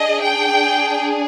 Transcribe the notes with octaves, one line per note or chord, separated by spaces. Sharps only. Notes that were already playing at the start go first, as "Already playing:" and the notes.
Already playing: D4 G#4 D#5
G5